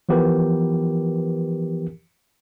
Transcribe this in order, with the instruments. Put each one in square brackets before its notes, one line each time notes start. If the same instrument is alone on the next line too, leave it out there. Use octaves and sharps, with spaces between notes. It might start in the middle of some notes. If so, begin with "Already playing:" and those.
[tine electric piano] E3 F3 B3 G4 A#4 B4